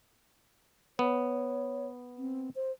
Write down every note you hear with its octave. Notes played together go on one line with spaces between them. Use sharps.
B3 C#5
C4
C5